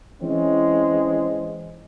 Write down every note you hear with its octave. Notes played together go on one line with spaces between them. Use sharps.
E3 G#3 C4 C#4